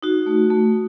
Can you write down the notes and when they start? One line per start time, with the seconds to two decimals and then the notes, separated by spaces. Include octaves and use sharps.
0.03 D#4 F#4
0.26 A3
0.50 A3